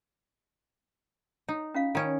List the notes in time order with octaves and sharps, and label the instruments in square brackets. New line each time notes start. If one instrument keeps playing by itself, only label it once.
[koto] D#4
[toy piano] C#4 F4 F5
[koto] D#3 C#4 [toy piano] F4 D5 G#5